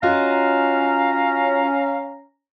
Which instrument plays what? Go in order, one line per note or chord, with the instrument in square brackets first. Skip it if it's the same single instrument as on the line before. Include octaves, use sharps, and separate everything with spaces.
[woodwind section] C#4 A#5 [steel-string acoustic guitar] F4 F#4 D#5 [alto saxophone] F5